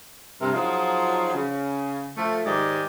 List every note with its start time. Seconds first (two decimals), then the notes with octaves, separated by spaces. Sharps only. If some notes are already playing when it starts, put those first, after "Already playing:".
0.41 G2 C3 A#4
0.54 F3 F#3 D#4 F4 G#4 C5
1.34 C#3
2.17 F3 A3
2.45 G#2 D#3 G4 D5 D#5